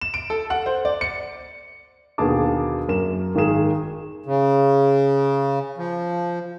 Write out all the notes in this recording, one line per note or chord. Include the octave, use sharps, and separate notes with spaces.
E7
D7
A4
F#5
C5
D5
C#7
D#2 B2 D3 G#4 A5 D6
F#2 A#3 E7
G#1 D#3 A#3 G#4 E7
C#3
F3